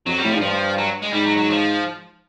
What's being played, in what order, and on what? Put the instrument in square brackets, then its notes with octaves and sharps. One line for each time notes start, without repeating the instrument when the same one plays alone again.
[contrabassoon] F2 [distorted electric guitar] F#3
[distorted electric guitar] G3
[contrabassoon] A2
[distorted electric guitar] F3
[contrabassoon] G#2
[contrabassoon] G2 [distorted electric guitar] F3
[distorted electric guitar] F#3
G#3
[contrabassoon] G#2 [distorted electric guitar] G3
[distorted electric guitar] F#3
F#3
F3